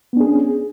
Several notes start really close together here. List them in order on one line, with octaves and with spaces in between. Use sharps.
B3 D4 G#4 C#4